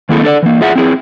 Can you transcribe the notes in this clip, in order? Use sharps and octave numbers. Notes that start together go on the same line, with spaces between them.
D#3 A#3 C4 E4 G#4 A4
D4 A4 C#5 D5
E3 A#3
F4 G#4 E5 F#5
C4 E4 G#4